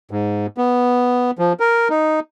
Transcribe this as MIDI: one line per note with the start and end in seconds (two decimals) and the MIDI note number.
0.11 0.46 44
0.58 1.31 59
1.39 1.53 53
1.60 1.88 70
1.90 2.20 63